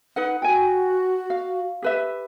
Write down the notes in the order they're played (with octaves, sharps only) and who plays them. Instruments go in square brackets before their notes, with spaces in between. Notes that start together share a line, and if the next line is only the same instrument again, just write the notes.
[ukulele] D#4 B4 F#5
[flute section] F#4 [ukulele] G5 G#5
[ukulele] F5
G4 B4 E5